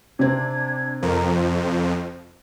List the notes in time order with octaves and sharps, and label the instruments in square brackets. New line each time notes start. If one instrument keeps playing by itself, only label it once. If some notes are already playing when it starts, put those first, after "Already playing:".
[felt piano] C3 C4 [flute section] D4 G#6
[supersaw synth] F2 [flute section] A#4 C5 A#5
[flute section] C5